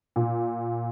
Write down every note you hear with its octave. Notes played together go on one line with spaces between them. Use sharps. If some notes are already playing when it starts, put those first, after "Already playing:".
A#2